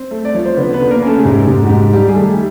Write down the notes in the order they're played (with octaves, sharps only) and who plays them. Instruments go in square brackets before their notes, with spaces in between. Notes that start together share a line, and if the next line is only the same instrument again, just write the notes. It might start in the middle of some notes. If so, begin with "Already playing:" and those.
Already playing: [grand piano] C4 C5
A3
D5
F3 C#5
C5
D3 B3 B4
B3 B4
D3
A#3 A#4
C#4
A3 A4
G#4
G#2 G4
G#2 G4
F#4
G#2 G4
G3 G4
G#4
D#3 A3 A4